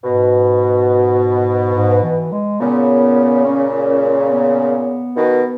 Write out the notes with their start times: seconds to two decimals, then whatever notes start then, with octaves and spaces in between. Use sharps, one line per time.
0.03 G#2 B2
1.74 G#2
2.03 E3
2.32 G#3
2.60 A#2 C#3 B3
3.46 C#4
3.88 C#4
4.10 C#4
4.31 B3
5.16 B2 D#3